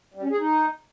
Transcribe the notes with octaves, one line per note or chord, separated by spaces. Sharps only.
G3
C#4
G#4
D#4